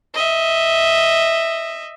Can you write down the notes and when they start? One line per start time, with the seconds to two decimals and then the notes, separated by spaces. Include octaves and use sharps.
0.14 D#5 E5